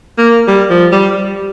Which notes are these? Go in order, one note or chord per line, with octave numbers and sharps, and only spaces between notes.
A#3
G3
F3
G3